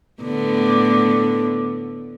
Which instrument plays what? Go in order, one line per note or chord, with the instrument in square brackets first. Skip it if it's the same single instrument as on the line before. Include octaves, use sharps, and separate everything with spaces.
[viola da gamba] A2 D3 B3